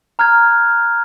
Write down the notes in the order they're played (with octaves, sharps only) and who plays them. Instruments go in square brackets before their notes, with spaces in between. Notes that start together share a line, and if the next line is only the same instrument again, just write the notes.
[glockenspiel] A#5 F6 F#6 G#6